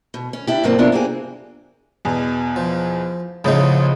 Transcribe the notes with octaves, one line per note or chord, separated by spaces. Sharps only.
B2
C#4
D4 E4 G4
G2 B2 D#3 F#3 A#3 C4
C3 B3 D4 E4 F4 A#4
A#3 C4 G4 G#4
E2 B2
F3
A1 A2 C#3 F3 D#4